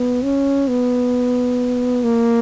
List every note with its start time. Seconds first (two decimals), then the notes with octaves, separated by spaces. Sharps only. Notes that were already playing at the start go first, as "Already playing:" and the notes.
Already playing: B3
0.24 C#4
0.68 B3
2.04 A#3